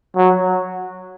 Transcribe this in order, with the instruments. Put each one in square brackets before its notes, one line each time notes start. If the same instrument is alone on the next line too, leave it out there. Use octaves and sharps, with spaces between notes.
[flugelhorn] F#3